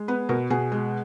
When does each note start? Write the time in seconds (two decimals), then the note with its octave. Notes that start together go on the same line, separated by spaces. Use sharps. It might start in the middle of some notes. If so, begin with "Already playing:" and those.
Already playing: G#3
0.08 B3 B4
0.29 B2 A#4
0.50 B2 G#4
0.72 G#3